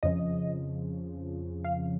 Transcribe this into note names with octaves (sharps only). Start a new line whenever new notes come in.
F2 C#3 F3 D#5
F5